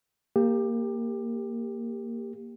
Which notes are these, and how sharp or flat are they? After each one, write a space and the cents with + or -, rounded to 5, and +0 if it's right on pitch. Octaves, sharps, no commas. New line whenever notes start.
A#3 -5 G4 +20